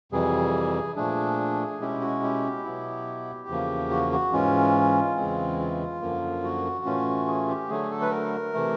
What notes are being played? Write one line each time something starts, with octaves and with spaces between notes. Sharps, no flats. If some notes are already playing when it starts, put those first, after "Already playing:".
F2 C3 E3 G3 G#4
A#2 F3 A3 D4 G#4
B2 G#3 C#4 E4 G4
F#4
G4
B2 F#3 B3 E4
E2 C#3 F3 A#3
F#4
F#4
G#2 E3 G#3 C#4 F4
E2 C#3 E3 G#3 C4
F4
F#2 D3 F3 A#3
F#4
A2 E3 A3 C#4 F4
G#4
G4
D3 F#3 A3 G#4
A4
B4
A#4
C3 E3 A3